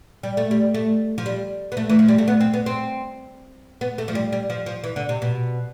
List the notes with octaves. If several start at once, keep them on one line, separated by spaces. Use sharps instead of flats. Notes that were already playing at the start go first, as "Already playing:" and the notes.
G3
A3
G3
A3
F3
G3
B3
A3
E3
F3
G3
A3
B3
C4
B3
C4
B3
A3
F3
G3
G3
F3
F3
E3
D3
C3
B2